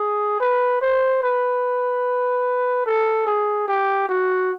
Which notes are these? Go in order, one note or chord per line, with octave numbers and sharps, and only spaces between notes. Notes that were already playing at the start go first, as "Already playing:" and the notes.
Already playing: G#4
B4
C5
B4
A4
G#4
G4
F#4